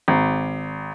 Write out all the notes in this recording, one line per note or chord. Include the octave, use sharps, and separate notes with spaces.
G#1